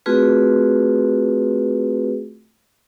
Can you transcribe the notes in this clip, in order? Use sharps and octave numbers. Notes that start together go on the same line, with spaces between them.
A3 C4 F4 F#4 G#4 B4